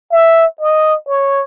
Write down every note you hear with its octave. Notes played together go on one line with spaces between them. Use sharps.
E5
D#5
C#5